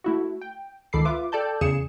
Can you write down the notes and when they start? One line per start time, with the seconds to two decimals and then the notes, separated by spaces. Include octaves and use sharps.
0.04 A3 E4 F#4
0.41 G5
0.93 C#2 D#3 A4 B5 D6 C7
1.05 F4 B4 E5 D6
1.32 A4 D5 G5 A5 G6
1.61 E2 C#3 G#4 C#7 E7